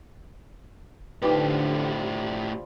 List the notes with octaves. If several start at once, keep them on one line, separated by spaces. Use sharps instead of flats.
A2 D3 F3 G3 D#4 G4 B4